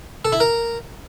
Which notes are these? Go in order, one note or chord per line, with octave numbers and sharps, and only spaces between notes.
A4
E4
A#4